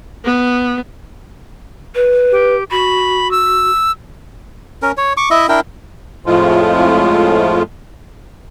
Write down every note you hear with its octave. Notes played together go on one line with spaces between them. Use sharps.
B3
B4
G4
F#4 B5
E6
C#4 A#4
C#5
C#6 D6
E4 D#5 E5
D4 E4 A#4 G5
F2 A2 F3 G#3 A3 F4